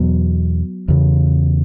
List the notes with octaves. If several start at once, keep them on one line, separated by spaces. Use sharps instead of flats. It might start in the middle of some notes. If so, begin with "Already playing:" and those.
Already playing: E2 B2 F#3 B3
E2 C#3